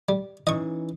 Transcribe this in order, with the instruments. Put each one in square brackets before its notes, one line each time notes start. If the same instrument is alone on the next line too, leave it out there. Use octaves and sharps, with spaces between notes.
[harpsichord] G3
[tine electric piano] E3 C#4 D#4 [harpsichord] D#5 C#6